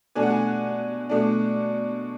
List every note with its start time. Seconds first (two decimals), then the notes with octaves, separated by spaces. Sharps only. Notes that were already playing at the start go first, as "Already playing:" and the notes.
0.15 B2 A3 D4 G#5
0.22 F#5
0.30 G#5
1.10 B2 A3 D4